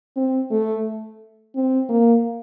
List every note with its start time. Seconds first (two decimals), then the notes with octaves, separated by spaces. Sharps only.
0.16 C4
0.51 A3
1.55 C4
1.89 A#3